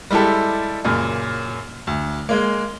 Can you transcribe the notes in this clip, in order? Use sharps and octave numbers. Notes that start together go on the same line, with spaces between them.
G3 G#3 E4 G4 A4
F#2 A#2 C#3
D2
G#3 A#3